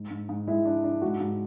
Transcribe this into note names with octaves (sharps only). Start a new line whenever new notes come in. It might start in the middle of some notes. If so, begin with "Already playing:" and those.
Already playing: G#2
G#2
G#2
G#3 E4
D4
D4
G#2 F#4
G#2